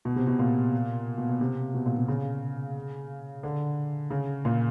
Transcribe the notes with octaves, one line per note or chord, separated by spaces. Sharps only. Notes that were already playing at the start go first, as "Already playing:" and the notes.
B2
C3
B2
A#2
B2
B2
C3
B2
A#2
C3
C#3
D3
C#3
A#2